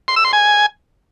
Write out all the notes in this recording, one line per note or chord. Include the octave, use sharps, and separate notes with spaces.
C6
E6
C6
G#5